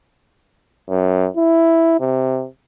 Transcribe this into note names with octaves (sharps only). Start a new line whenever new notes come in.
F#2
E4
C3